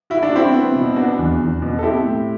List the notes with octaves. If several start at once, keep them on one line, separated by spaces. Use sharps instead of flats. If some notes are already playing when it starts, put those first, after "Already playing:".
E4 F#4
D4
C4 E4 F#4
B3
B2
B3 D4 F#4
E2
E2
B2
A4
C4 E4 G4
A2